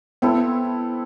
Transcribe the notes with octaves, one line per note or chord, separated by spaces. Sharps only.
B3 C4 E4 A4